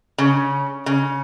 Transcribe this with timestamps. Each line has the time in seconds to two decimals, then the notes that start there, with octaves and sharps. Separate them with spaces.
0.18 C#3
0.86 C#3